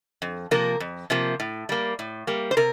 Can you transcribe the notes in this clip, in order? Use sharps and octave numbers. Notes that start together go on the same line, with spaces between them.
F2
C3 F3 A#3 A#4
F2
C3 F3 A#3
A2
G3 A#3
A2
G3 A#3
C5
C3 A#4